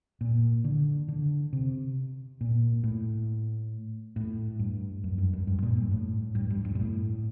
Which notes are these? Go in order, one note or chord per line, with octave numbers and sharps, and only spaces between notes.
A#2
D3
D3
C3
A#2
A2
A2
G2
F#2
G2
F#2
G2
A#2
G2
A2
G2
G2
G2
A#2
A2